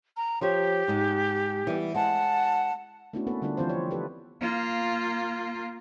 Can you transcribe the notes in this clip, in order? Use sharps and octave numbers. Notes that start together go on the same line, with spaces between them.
A#5
F3 G4 C5 C#5
G#2 G#3
E3 G3 B3
G#3 C4 F#5 A5
A3 B3 C#4 D4 E4 F#4
A#3 B3 A4 B4
D3 G3 B3 D4 F4
E3 F3 C4 E4 F4 C5
C#5 D5
G4 A4 B4
A#3 F4